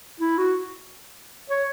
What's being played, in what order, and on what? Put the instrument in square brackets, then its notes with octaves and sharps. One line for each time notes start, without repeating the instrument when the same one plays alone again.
[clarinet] E4
F#4
C#5